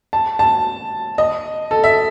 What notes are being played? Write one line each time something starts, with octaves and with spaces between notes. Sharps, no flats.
A5
A5
D#5
A4
E5